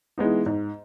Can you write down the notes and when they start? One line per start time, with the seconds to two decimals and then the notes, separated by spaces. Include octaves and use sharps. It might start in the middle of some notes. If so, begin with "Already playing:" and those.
0.18 E3 G#3 B3 D#4
0.46 G#2